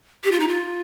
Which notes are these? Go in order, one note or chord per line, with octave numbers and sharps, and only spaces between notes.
G4
F4
D#4
F4